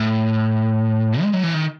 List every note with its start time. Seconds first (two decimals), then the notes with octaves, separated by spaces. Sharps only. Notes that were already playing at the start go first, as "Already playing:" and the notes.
Already playing: A2
1.22 G#3
1.33 F#3
1.43 E3
1.54 D#3